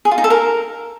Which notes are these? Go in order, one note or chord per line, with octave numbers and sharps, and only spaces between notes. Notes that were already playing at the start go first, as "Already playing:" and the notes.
G#4
F4
D#4
A4
A#4